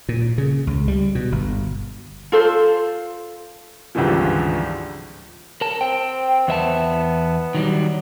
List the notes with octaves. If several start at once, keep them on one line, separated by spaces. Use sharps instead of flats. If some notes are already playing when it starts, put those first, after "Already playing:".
A#2
C#3
C#2
G3
B2
G1
F4 A4 C5
G#1 C#2 G2 D3 E3 F3
A#4 A5
C4 G5
E2 B3 E5 A5
D#3 F#3 G3